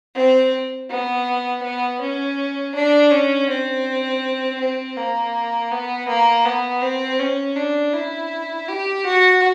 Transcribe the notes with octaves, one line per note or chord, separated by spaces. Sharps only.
C4
B3
B3
C#4
D4
C#4
C4
C4
A#3
B3
A#3
B3
C4
C#4
D4
E4
G4
F#4